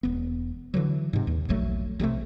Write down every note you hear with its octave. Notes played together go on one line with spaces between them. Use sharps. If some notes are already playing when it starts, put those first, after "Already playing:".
E1 B3
D3 E3 F#3
G#2 C3
D#2
D#1 A#1 F#3 A3
B1 C3 G3 A3